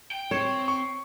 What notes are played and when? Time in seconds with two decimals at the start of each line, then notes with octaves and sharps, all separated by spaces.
0.11 G5
0.31 C4 C#5
0.68 C#6